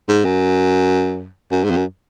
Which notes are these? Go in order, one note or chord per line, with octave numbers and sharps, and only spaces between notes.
G#2
F#2
F#2
G#2
F2
F#2